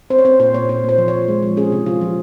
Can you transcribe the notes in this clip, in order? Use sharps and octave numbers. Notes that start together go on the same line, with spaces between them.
C4 C5
C#5
C4 C5
A#2 C5
A#2 C#5
A#2 C5
A#2
C5
F3
C#5
A#2
G#3
F3
C#4 G#4
C3
F3 F4
F3